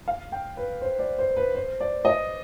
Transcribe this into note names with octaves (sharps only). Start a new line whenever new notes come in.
F5
G5
B4
C5
D5
C5
B4
C5
D5
D#5